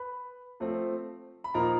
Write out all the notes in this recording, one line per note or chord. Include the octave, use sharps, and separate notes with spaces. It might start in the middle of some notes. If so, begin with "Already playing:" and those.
Already playing: B4 B5
F3 A3 C4
B5
A#2 F3 A#3 D#4 A#4 A#5